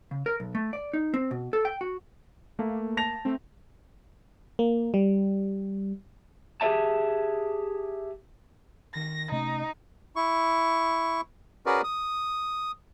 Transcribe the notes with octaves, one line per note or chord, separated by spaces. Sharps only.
C#3
A#4
B1
A3
D5
D#4
C4
B2
A4
G5
F#4
A3 A#3
A5 A#6 F7
A3 C4
A#3
G3
G4 G#4 A#4 C#5 E5 A5
D#3 A#6
C3 A3 C#4 D#4 D#5
E4 C#6
C#4 F#4 G#4 A#4 B4 D5
D#6